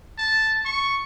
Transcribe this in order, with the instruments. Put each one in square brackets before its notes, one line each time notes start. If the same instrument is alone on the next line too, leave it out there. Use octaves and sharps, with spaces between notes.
[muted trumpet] A5
C#6